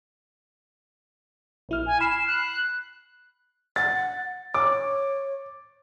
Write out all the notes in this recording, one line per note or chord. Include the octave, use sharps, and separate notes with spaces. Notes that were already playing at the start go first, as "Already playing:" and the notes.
A#1 E4 F6
G#5
B5 F6 C7 E7
F#6
F#5 A6
C#5 D6